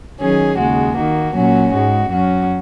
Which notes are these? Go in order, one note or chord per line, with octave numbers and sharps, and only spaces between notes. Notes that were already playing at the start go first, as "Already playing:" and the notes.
D#3 F#3 C#4 G#4
D#2 C#3 G#3 F#4
D#3 A#3 F#4
A#2 F#3 C#4 F#4
G#2 G#3 F#4
F#2 F#3 C#4 F#4